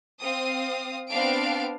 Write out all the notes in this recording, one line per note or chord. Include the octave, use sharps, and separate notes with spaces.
C4 F5 D#6
B3 C4 D4 F5 D7